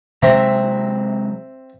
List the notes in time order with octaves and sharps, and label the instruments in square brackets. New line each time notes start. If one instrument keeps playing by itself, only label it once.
[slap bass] C3 F#3 G#3 [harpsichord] C4 E5 A#5